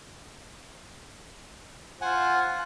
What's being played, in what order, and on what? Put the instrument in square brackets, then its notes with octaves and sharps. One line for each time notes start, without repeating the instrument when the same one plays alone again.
[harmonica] F4 C5 [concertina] F#5 G#5